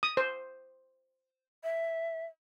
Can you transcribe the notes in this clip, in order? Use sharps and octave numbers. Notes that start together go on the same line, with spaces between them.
D#6
C5
E5